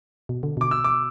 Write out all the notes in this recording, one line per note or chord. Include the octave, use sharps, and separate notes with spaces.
B2
D3
B2 D6
E6
D6